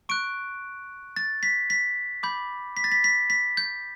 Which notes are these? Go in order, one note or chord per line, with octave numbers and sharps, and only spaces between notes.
C#6 F#6 D7
A6
B6
B6
B5 D6 G6
B6
A6
B6
B6
B6
G6